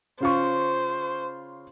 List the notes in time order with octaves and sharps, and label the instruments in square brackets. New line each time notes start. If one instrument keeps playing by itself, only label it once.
[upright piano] C#3 F4 C#6 [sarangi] C5